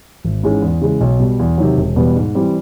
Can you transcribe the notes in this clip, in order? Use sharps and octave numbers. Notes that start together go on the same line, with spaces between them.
G#1
G#2 E3 G#3 C#4
E2
C#3 E3 G#3
B1
B2 G3
E2
C3 D#3 F#3
E1
E2 B2 G3 B3
G#2
E3 G3 C4